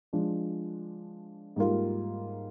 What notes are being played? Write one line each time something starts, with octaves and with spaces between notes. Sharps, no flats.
F3 G#3 D4
G#2 G3 A#3 F4